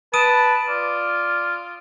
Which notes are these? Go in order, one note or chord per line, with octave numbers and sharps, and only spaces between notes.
B4 A5 D#6 D7 D#7
F4 D5